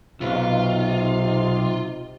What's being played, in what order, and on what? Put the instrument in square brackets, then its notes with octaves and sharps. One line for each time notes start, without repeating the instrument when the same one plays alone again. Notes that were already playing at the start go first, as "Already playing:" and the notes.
[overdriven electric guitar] B1 [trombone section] C3 D#4 [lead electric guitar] F4